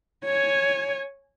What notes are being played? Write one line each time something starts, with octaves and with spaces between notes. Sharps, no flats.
C#5 G#5